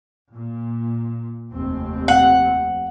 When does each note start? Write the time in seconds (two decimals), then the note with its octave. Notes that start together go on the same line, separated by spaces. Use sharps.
0.30 A#2
1.50 F1 D#2 C4
2.08 F#5